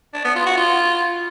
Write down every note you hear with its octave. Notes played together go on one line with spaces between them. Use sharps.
D4
B3
F4
F#4
F4